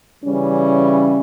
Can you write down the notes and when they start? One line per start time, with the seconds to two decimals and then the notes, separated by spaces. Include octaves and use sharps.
0.23 C#3 E3 G3 C#4